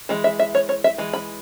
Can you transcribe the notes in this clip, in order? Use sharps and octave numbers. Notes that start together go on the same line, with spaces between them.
E3 G#3
E5
E5
C#5
C#5
E5
E3 G#3
B5